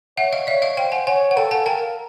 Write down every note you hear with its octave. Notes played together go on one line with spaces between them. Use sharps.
C#5 E5 F#5
D#5 F5
C#5 D5 E5
D#5 F5
C5 F5 G5
F#5 G#5
C#5 F#5 G#5
F#5
A4 F5 G5
F#5 G#5
A#4 F5 G5